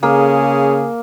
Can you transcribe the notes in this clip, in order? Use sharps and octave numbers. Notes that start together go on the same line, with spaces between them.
C#3 A#3 G#4